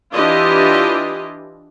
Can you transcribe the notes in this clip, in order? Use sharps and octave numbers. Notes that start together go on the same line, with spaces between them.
E3 D4 E4 F4 G4 D#5